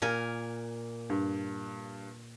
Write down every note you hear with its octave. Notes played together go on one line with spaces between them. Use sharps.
A#2 A#4 G#5
G2